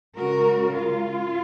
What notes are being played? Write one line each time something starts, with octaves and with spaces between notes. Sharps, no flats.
C#3 G#3 C#4 F#4 A#4
F4